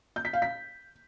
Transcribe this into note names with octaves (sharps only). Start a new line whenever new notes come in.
G6
B6
F5
B6